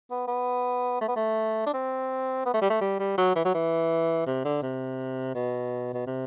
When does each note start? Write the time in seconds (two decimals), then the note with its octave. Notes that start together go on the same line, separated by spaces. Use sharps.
0.11 B3
0.28 B3
1.01 A3
1.08 B3
1.16 A3
1.66 D4
1.74 C4
2.46 B3
2.54 A3
2.62 G3
2.70 A3
2.81 G3
3.00 G3
3.18 F#3
3.36 E3
3.45 F#3
3.55 E3
4.26 C3
4.45 D3
4.63 C3
5.35 B2
5.94 B2
6.07 C3